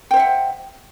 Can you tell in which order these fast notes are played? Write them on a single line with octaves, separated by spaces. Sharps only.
G5 C5 E5 F#5